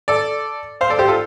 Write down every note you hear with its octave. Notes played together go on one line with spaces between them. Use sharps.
A4 D5
C5 F5
A4 D5
G4 C5
F4 A4